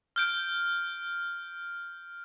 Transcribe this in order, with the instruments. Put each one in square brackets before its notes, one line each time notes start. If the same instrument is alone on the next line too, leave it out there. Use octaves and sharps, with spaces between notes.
[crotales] F6 G6 D7